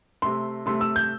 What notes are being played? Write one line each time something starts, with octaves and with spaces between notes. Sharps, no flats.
C3 A3 C6
C3 A3 C6
E6
G6